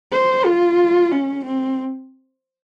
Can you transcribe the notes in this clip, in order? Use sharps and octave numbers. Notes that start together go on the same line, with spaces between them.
C5
F4
C#4
C4